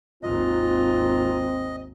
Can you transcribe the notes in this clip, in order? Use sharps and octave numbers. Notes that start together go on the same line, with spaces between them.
G#1 D#2 C4 F4 D#5